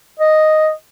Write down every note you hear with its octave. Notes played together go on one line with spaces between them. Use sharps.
D#5